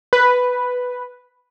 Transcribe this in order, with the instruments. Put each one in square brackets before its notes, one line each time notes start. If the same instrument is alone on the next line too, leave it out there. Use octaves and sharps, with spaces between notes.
[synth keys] B4